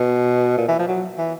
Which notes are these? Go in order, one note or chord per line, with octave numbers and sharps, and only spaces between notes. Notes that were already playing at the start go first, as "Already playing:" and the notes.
Already playing: B2
A#2
E3
F3
F#3
E3